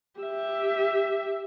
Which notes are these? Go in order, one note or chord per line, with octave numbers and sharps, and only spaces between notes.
G4 E5